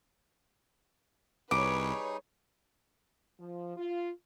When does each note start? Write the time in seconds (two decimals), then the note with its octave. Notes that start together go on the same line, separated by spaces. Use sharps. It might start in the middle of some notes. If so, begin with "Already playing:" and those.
1.51 C2 G3 D#4 G#4 B4 C#5 D6
3.39 F3
3.77 F4